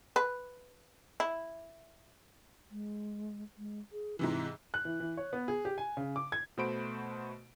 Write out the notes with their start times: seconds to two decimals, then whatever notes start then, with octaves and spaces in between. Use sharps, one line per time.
0.16 B4
1.20 E4
2.71 G#3
3.58 G#3
3.92 G#4
4.19 G#2 C3 E3 E4
4.74 F#6
4.85 E3
5.00 E3
5.17 C#5
5.33 B3
5.48 G#4
5.65 G4
5.78 G#5
5.97 C#3
6.16 D6
6.32 G#6
6.57 B2 A3 F#4 C5 B5 D7